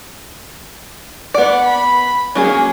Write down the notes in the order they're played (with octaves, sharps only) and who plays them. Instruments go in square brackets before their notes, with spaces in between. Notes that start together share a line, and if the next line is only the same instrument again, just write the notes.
[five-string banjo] B3 D5 [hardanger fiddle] F#5
[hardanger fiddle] B5
[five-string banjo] F#3 A#3 G#4 [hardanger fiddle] C#4